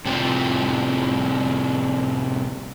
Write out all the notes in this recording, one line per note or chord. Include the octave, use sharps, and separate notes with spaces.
A2 C3 G3 C4 F4